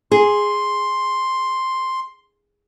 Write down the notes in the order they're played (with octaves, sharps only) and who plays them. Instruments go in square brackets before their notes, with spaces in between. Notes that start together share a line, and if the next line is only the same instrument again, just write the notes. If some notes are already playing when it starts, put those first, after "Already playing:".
[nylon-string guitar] G#4 [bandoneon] C6